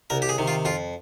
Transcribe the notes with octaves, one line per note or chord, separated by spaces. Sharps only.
C2 A#4
G4
G#4
C3 D#3
F4
F2 F4